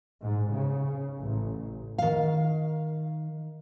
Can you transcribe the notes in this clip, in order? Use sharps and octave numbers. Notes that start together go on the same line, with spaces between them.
G#2
C#3
A1
D#3 F5